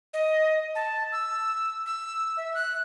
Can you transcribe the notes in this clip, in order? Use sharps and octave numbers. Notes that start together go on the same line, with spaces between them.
D#5
A5
E6
E6
E5
F#6